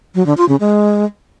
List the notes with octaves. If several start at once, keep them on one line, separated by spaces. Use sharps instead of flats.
F#3
D3
F4
C#3
G#3